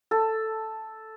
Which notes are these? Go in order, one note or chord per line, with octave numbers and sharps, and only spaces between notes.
A4